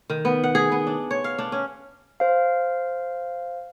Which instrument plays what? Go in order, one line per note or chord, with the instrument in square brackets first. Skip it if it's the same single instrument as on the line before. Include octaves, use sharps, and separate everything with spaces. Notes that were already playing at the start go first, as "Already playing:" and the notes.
[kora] D#3
B3
F#5
G#4
B3
D4
C#5
F5
D4
C#4
[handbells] C5 F5